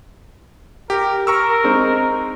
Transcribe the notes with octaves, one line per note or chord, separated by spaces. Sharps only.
G4 A#4
A#4 A#5 C#6 E6
G#3 C4 D#4